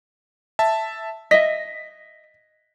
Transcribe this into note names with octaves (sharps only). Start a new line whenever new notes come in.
E5 A5
D#5 E5 A#6 B6